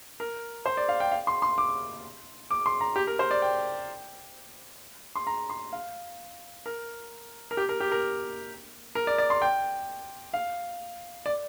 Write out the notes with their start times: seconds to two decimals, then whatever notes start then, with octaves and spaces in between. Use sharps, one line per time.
0.20 A#4
0.66 C5
0.77 D5
0.89 F5
1.00 G5
1.12 F5
1.27 C6
1.42 C6
1.58 D6
2.51 D6
2.66 C6
2.81 A#5
2.96 G4
3.07 A#4
3.19 C5
3.31 D5
3.42 G5
5.15 C6
5.27 A#5
5.50 C6
5.73 F5
6.66 A#4
7.51 A#4
7.57 G4
7.69 A#4
7.80 G4
7.92 A#4
8.95 A#4
9.07 D5
9.18 D5
9.30 C6
9.42 G5
10.34 F5
11.26 D5